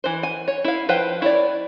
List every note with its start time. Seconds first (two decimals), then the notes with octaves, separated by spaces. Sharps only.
0.04 E3 C5
0.23 G#5
0.48 C#5
0.64 E4 F5
0.89 F3 B4 C5 F5 G5
1.22 E4 C#5 D5